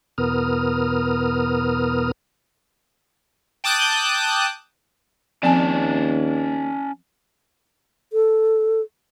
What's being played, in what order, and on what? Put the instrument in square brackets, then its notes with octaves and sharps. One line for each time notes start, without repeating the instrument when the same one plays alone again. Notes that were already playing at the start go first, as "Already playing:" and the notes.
[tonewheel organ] E2 B2 B3 A#4 D#6 F6
[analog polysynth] G5 A5 D6 D#6 F#6 G6
[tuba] D#2 [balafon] F3 C4 G#5 [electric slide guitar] C#4 D5 A5
[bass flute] A4